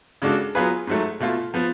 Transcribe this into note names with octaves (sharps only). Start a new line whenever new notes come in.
C#3 G#3 D4 F#4 A4
F#3 B3 F4 G#4 B4
G#2 F#3 A3
B2 A3 F4
F3 B3